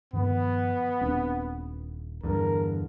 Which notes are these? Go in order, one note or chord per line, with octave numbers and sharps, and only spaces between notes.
G2 D#3 F3 B3
D#1 C4 D4
E2 G2 D3 A#4